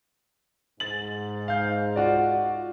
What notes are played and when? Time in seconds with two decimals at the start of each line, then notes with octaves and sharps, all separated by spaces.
0.80 G#2 A6 F#7
1.48 F5 G6
1.96 F4 F#4 D5